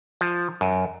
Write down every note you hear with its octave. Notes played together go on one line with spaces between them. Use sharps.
F3
F#2